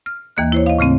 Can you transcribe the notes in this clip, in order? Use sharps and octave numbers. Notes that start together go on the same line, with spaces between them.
F6
D#2 E3 A#3 D#5 F#6
E4 C5 C#5
D#5 F5
A2 C#3 A3 C4